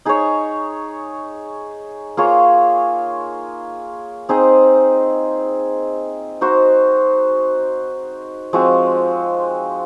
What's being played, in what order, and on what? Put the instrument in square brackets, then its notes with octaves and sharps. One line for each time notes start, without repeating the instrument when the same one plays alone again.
[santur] D#4 G#4 C#5
A#3 F4 G#4 C#5
C4 D#4 G#4 D#5
D#4 F#4 C5
F3 G#3 C4 F#4